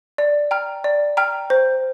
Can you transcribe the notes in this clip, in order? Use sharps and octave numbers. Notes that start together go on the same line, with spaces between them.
D5
G5 A#5 F6
D5
G5 A#5 F6
C5